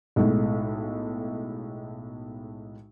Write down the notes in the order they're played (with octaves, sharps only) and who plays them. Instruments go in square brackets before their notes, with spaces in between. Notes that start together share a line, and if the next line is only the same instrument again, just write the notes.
[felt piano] B1 A2 G#3